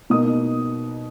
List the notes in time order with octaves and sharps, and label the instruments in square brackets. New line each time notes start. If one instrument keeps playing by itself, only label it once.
[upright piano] B2 A#3 D#4 D#6